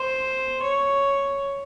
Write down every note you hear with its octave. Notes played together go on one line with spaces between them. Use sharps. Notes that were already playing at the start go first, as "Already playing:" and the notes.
Already playing: C5
C#5